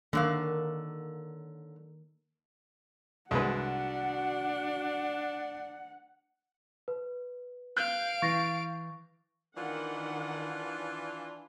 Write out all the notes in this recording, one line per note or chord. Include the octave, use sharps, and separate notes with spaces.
D3 D#3 F#3 A#3 F5
C2 G#3 D4 F#4 B4 F#5
B4
F5 F#6 G6 D7
E3 C#6 A6 A#6
D#3 E3 D4 F4 F#5